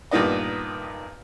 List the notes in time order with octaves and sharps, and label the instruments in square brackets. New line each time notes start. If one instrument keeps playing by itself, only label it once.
[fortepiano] G2 A#2 D#3 B3 D#5